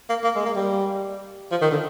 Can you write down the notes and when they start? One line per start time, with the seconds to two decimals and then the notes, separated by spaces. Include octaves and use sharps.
0.09 A#3
0.24 A#3
0.36 G#3
0.45 A#3
0.56 G3
1.51 F3
1.62 D#3
1.72 D3